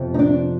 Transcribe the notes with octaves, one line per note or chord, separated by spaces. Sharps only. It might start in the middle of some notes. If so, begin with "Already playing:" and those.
Already playing: F2 C3 F3 B3
D#4
D4